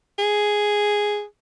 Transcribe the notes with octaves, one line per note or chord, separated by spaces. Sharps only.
G#4